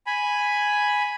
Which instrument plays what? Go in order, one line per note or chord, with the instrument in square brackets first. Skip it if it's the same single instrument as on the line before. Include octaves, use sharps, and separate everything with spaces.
[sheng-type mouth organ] G#5 B5